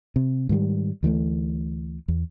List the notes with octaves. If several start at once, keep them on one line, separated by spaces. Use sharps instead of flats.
C3
G#2 D#3 F#3 G3
D2 E3 F#3 A3
E2